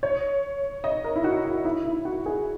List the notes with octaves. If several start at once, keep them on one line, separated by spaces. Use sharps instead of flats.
C#5
D#5
A#4
E4
F#4
F#4
E4
E4
F#4
G#4